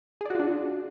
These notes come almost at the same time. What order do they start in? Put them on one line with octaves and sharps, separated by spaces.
G#4 D5 F#4 F4 D4